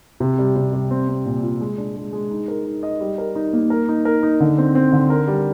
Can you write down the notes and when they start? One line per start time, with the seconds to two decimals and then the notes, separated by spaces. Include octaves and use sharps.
0.20 C3
0.39 G3
0.56 C3
0.73 G3
0.91 C4
1.08 C4
1.26 A#2
1.43 F4
1.61 G#3
1.78 D4
1.96 G#3
2.13 G#3
2.31 D#4
2.48 A#4
2.66 D#4
2.83 D#5
3.00 G3
3.18 A#4
3.36 D#4
3.53 A#3
3.70 A#4
3.89 D#4
4.05 A#4
4.23 D#4
4.40 D3
4.58 C4
4.75 C4
4.93 D3
5.10 A#4
5.28 G3